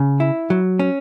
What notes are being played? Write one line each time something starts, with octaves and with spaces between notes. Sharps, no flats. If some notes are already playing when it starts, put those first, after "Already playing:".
Already playing: C#3
E4
F#3
C#4